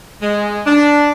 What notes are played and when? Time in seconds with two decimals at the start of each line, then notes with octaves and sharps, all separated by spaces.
0.21 G#3
0.66 D4